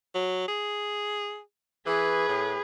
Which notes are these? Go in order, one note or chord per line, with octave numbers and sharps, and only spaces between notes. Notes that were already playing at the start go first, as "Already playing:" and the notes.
F#3
G#4
E3 G#4 B4
A2